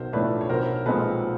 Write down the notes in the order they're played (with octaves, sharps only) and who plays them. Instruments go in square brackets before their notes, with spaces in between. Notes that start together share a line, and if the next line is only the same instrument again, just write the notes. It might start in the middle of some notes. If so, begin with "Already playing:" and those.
Already playing: [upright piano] B1 [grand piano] A#4 C5
[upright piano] A2 F3 A3 D4 [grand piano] B4 C#5
[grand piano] C#5
[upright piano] B1 [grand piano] A#4 C5
[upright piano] A#2 F3 G#3 C4 [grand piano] A4 B4